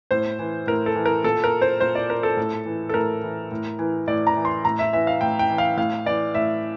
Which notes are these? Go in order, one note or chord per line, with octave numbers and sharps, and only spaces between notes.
A2 C5
E3
A2 A#4
A4
E3
A#4
A#2 A4
A#4
C5
A#2 C5
D5
A#4
A4
A2
E3
A4
A2 A#4
E3
A2
E3
A2 D5
A#5
E3
C6
A2 A#5
E5
E3 E5
F5
A2 G5
G5
E3
F5
A2 F5
E3 D5
A2 E5